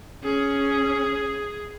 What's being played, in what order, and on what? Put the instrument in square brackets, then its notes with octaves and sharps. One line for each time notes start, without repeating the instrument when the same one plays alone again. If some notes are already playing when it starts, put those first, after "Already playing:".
[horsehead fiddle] C#4 [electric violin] G#4